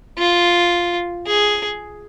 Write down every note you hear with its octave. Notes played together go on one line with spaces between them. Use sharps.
F4
G#4